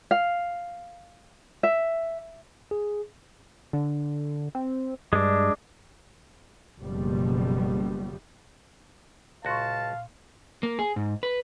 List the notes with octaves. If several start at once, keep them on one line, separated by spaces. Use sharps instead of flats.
F5
E5
G#4
D3
C4
G2 G#3 D4
F#1 B2 F3 G3
C#2 A#2 F#4 F5 A5 C6 C#6
A#3
G#4
G#2
B4